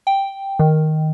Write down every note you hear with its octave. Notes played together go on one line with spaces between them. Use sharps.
G5
D#3